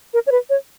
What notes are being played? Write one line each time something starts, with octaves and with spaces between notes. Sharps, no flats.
A#4
C#5
B4
C#5